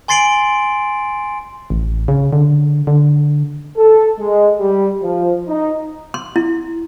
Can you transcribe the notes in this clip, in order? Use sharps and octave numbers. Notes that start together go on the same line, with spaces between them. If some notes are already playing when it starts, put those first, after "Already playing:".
G#5 C6 A6 C7 D7 F#7
A1
C#3
D3
D3
A4
G#3
G3
F3
D#4
C6
E4